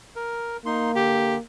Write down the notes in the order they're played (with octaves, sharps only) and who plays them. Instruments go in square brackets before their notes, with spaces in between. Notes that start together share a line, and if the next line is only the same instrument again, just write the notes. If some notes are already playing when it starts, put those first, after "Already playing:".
[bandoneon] A#4
[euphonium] A#3 [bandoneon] D#4 C6
[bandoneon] D3 [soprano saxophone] G4